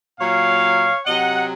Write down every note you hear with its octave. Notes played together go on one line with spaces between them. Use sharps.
A#2 F#3 C#5 F5
C3 F#3 D#5 F#5